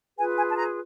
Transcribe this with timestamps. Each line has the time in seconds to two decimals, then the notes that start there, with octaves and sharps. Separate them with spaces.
0.17 F4 G#4 B4 G#5
0.37 G#5
0.49 A5
0.56 A#5